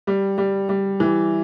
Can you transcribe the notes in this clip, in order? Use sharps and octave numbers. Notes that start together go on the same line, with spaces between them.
G3
G3
G3
E3